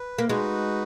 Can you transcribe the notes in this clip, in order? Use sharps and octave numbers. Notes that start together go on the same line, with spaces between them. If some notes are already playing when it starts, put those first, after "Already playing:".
Already playing: B4
A#3
G#3 D#4 F#4 B4